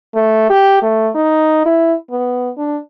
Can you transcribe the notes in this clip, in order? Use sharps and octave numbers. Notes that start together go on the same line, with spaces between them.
A3
G4
A3
D#4
E4
B3
D4